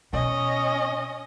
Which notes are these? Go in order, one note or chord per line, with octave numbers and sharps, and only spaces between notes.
B2 C#4 D#5